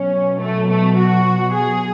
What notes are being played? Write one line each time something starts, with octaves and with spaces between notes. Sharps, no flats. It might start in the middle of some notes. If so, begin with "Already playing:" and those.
Already playing: B2 F#3 C#4
A3
A3
F#4
G#4